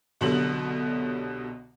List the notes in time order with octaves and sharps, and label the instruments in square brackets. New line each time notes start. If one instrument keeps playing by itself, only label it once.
[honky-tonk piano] C2 B2 D3 F#3 G3 F#7